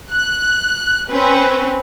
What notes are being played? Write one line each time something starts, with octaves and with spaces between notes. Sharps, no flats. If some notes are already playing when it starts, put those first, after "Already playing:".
F#6
C4 C#4 B4